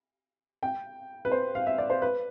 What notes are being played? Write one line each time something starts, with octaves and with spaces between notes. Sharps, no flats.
G5
B4
C5
F5
E5
D5
C5
B4